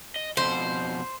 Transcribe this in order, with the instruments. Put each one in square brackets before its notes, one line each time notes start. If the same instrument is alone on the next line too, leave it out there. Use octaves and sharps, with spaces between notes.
[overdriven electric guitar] D#5
[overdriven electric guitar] F2 B2 [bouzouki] C5